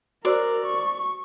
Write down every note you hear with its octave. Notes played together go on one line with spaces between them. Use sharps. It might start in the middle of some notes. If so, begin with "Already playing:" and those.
F#4 A#4 C5 D5 E6
C#6